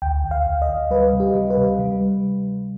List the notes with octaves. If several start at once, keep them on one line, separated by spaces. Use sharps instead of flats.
D2 G5
D2
F5
D2
D#5
D2
G3 B4
C3
G4
G3
B4
C3
G3